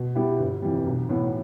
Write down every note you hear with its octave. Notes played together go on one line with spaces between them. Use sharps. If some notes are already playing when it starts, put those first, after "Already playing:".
Already playing: B2
G3 B3 E4 G4
G1
F2 E3 G3
B1
A2 E3 B3